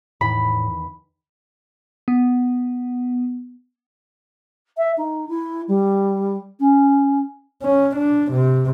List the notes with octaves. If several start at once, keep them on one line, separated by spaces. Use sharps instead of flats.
E2 A2 D#3 B5
B3
E5
D#4
E4
G3
C#4
C#4
D4
C3